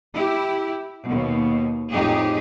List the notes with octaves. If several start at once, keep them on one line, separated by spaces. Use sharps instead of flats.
E4 G4
D#2 B2
F2 A2 D#4 G4 G#4